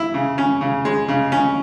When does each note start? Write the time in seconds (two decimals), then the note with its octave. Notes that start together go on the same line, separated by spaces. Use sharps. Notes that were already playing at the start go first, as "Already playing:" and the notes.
Already playing: E4
0.14 C#3
0.38 C#4
0.61 C#3
0.85 G#3
1.08 C#3
1.32 C#4